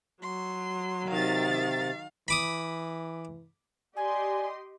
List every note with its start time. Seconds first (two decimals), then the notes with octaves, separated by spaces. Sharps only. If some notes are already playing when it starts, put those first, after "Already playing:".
0.22 F#3 C6
1.10 C3 D#3 F5 A6
2.28 E3 B5 D6 D#6
3.96 G4 D5 D#5 G#5 C6